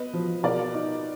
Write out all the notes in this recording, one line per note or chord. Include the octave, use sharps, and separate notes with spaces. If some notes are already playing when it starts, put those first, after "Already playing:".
Already playing: B3 B4 D#5
F3
B2 A#4 D5
D#4